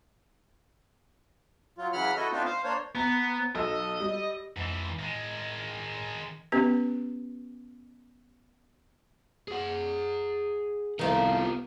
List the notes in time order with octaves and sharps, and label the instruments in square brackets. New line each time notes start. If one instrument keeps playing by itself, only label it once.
[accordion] F#3 F4
C#3 E3 F#3 F#5 B5 F6
E4 F#4 A4 D#5
A3 B3 C4 D4 D#4 F4
C5 F5
A#3 D4 C5 C#5
[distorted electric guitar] B3 [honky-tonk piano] A#5
[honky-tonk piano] B1 A4 E6 [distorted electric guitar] D#5
[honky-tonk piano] G3
[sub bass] F2 [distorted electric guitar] G#2 E3
[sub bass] A2 [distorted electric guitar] D#3 G#3
[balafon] B3 C#4 G4 B4
[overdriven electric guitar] G#4 F#5
[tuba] C2 [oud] D#3 F3 A3 [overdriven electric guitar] B3 A#4